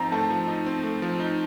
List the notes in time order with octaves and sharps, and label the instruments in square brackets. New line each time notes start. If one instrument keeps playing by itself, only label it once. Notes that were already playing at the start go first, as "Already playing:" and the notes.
Already playing: [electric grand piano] F3 C4 D#4 [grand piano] A#5
[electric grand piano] A3 [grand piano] A5
[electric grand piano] F3
D#4
C4
A3
F3
D#4